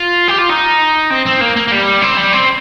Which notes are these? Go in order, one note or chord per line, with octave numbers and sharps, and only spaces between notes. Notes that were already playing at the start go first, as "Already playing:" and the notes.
Already playing: F4
G4
F4
D#4
C4
C4
A#3
A#3
A#3
G3
C4
G3
C4